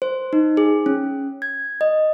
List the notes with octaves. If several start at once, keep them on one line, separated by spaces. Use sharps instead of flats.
C5
D#4
G#4
C#4
G#6
D#5